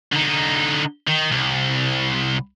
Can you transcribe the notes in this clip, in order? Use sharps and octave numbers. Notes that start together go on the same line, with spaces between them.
D3 D#4
D#3
C2